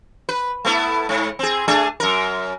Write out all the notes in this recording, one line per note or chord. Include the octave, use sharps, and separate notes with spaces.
B4
A3 B3 E4
G#2
C4 G#4
A3 D4 G#4
F#2 A#4